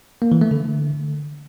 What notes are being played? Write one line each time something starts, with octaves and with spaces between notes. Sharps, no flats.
A#3
E3
A3
D3